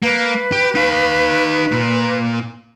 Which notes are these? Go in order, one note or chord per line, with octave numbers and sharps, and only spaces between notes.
A#3 B4
G4
D#4 F5
A#2